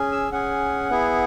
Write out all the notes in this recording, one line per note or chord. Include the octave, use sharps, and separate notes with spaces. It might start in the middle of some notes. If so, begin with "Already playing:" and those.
Already playing: C#4 G#4
E6
C#4 G#4 F#5
B3 E4 G#4